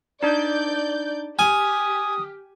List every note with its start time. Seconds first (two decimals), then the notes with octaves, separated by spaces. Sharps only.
0.23 D4 D#4 D5 G6
1.39 G4 G#5 D#6 F6